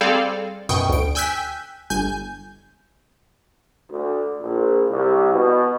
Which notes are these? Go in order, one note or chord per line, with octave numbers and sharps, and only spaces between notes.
G3 C4 G#4 A4 D5 F5
F#2 B2 G5 C#6 D#6
D2 D7
G5 G#5 E6 F#6 G6 B6
G1 G#5 G6
D2
A#1
C2
B2